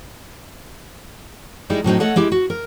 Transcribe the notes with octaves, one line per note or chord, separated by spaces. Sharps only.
G3 G#3 D#4 E4
A2 F#3 C4 D#4
A3 A4 C#5 D#5 F#5
G#3 E4 G4
F#4
A#4